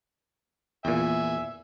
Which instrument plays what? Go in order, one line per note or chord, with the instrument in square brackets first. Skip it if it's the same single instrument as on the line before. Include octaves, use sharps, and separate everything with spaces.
[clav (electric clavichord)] E2 A#2 [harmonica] E5 G#5